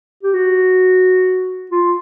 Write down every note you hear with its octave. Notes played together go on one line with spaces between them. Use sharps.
G4
F#4
F4